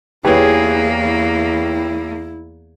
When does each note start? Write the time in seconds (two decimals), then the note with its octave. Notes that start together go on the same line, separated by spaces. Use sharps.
0.24 E2 A#3 E4 G4 G#4 B4 C#5
1.07 E4